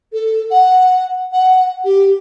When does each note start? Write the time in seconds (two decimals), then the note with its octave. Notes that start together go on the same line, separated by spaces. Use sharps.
0.13 A4
0.51 F#5
1.32 F#5
1.85 G4